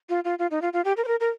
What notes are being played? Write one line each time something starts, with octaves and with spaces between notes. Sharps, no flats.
F4
F4
F4
D#4
F4
F4
G4
A#4
C5
A#4
A#4